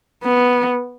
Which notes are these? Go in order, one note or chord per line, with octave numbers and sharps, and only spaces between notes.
B3